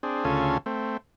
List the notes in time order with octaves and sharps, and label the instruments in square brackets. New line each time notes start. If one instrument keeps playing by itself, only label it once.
[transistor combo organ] C4 D4 G#4
D2 C#3 C#4 F4 A4 G#5
A3 C4